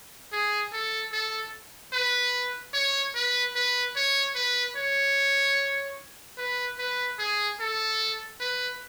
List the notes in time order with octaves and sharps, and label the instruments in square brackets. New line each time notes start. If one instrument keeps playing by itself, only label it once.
[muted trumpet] G#4
A4
A4
B4
C#5
B4
B4
C#5
B4
C#5
B4
B4
G#4
A4
B4